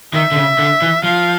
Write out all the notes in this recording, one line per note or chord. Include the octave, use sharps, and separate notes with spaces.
D#3 E5
D3
C#3
D3
E3
F3 F5